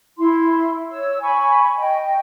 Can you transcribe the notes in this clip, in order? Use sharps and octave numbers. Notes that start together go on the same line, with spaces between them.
E4 C6
C#5 E6
G#5 B5 C#6
D#5 G5